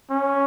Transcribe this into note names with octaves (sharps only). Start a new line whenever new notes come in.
C#4